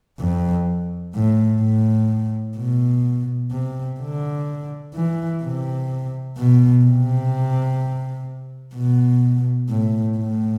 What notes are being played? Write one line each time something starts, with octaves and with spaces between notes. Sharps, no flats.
F2
A2
A2
B2
C3
D3
E3
C3
B2
C3
B2
A2
A2